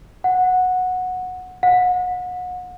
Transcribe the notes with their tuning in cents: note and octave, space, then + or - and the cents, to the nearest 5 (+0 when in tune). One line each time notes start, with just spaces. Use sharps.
F#5 -10
F#5 -35